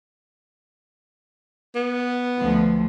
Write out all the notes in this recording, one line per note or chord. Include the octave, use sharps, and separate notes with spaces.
B3
D2 F3